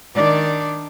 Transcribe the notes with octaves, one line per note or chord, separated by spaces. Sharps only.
D#3 D4 D5